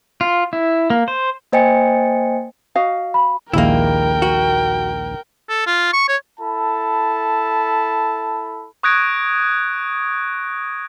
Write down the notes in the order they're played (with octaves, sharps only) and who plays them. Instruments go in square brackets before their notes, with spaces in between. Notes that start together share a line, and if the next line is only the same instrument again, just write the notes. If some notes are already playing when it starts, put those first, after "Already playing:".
[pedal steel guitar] F4
E4
A#3
C5
[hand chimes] A#3 C5 D#5 G5 G#5 C#7
[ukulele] F#4 D#5 F5
[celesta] B5
[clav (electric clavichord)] A#1 D#2 G#3 [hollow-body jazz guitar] A#3 E4 [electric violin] A#4 G5
[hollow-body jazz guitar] F#4
[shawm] A4
F4
C#6
C#5
[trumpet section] E4 A4 A5 B5
[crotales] C#6 D#6 F#6 G#6 A#6 D7